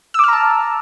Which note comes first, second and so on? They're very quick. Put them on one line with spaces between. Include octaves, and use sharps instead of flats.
E6 D6 F6 A#5 A5